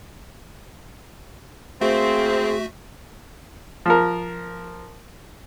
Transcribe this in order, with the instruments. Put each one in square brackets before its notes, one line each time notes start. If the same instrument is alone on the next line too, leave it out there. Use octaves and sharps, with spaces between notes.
[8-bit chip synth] A3 F#4 E5 [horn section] A#3 C4 [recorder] G#4
[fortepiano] F3 A#4